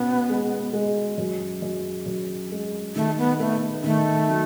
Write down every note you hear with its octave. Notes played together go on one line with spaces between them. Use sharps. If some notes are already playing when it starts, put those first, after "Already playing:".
Already playing: B2 B3 C#4
G#3
G#3
F#2
F#2
F#2
G#3
D#3 A3
B3
A3 B3
D#3 A3
F#3